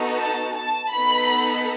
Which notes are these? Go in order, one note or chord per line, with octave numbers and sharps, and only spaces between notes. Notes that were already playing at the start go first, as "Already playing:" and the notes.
Already playing: B3 D#4 F#4 A4
A5
A5
B3 D#4 A4 B5